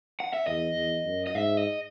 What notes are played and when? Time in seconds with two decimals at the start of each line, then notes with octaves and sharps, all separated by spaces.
0.20 F#5
0.33 E5
0.47 E2 D#5
0.76 E2
1.05 F#2
1.27 D#5
1.35 G#2 E5
1.57 D#5